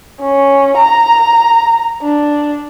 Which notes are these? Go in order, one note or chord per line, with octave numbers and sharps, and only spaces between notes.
C#4
A#5
D4